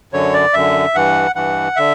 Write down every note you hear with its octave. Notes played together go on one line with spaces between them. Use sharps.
F#2 D3 C#5
D5
F#2 D3 E5
G2 E3 F#5
G2 E3 F#5
D3 E5